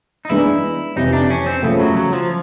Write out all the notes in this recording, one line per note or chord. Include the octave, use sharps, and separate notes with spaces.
D#4
E3 G#3 B3 D4 E4
F2 C3 E3 D#4
D4
C#4
C4
C#3 F3 A3 B3
F#3
F#3
F3